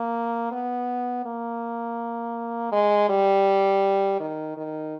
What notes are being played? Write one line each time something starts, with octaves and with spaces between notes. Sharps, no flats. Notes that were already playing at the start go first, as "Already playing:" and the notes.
Already playing: A#3
B3
A#3
G#3
G3
D#3
D#3